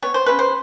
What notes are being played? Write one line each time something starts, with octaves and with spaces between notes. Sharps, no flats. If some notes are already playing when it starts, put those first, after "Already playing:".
B3 C#5
C5
C#3 B4
C5